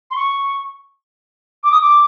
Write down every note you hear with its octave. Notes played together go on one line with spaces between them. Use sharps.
C6
C#6
D6
D#6
D6